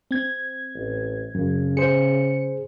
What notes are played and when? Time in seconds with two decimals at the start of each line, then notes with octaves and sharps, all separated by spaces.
0.11 C4 G#6
0.74 A1
1.35 F#2 C#3
1.77 G#4 C5 C#7